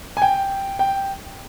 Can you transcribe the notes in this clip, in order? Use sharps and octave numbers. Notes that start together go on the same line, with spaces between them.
G#5
G5
G5